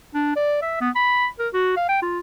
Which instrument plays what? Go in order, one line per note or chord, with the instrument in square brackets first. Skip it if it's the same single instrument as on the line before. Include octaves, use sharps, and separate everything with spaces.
[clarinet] D4
D5
E5
B3
B5
A#4
F#4
F5
G5
F4